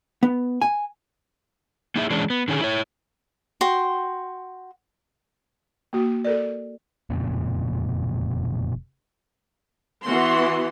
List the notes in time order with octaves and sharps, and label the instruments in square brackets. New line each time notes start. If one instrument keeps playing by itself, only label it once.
[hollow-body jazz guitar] B3
G#5
[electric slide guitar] A#3 D#4 E4 G#4 D5 E5
E3 G#3 C#4 D4
B3
D3 D#3 C#4 G#4
E4 C#5
[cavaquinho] F#4 G5 C6
[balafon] A#3 F#4
A4 A#4 D5
[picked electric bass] E1 F2 A#2 C#3
[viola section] E3 B3 F#4 C6